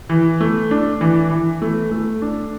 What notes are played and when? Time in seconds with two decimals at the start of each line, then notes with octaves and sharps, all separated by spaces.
0.09 E3
0.41 A3
0.71 D4
1.01 E3
1.31 E3
1.62 A3
1.92 A3
2.22 D4